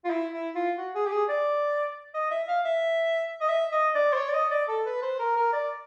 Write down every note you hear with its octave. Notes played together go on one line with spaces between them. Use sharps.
F4
E4
E4
F4
F#4
G#4
G4
G#4
D5
D#5
E5
F5
E5
D#5
E5
D#5
D5
C5
C#5
D5
D#5
D5
A4
B4
C5
A#4
A#4
D5